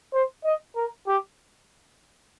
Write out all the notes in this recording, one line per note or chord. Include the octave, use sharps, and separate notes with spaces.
C5
D#5
A#4
G4